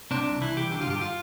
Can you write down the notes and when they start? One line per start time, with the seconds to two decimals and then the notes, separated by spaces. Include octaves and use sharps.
0.11 C3 D4
0.27 C2
0.41 E3 E4
0.56 C2 G4
0.71 D3 G4
0.81 F4
0.86 G2 G4
1.01 F4